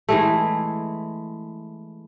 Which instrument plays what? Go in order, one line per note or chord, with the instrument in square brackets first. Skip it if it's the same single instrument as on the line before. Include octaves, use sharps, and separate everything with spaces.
[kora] E3 G#3 A3